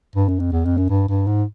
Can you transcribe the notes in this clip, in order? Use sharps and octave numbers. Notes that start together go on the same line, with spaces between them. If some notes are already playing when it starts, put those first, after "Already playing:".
G2
F#2
F2
E2
F2
F#2
G2
G2
G#2